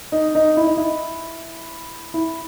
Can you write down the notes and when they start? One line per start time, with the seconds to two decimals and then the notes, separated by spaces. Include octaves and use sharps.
0.12 D#4
0.35 D#4
0.57 E4
0.67 D#4
0.77 E4
2.14 E4